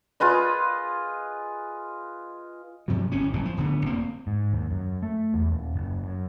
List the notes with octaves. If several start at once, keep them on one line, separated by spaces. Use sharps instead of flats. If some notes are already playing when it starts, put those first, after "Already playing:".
F4 G#4 B4 D#5
G2 C3 F3 F#3
G1 C4 C#4
G1 F#2 A#2 C#3
F3
D1 D3 B3
F1 A#3 C4
G#2
D#2
F#2
A3
E2
D#1
F#1
F#2